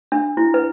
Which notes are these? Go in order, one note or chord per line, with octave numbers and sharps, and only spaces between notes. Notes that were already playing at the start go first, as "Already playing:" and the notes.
D4
E4
B4